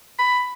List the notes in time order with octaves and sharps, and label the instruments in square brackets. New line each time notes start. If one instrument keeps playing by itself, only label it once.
[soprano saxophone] B5